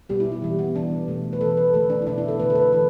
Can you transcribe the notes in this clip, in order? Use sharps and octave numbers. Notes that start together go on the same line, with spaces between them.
B2 G3 B3 G4
E4
E4
E3 G3 B3
B3
E3 G3 B3 D4
B2 A3
B4
E3 A3 A4
B4
D3 A3 A4
D4
E4
B2 B3 D4
E4
A4
D3 A3 B4
A4
B4
E3 B3 A4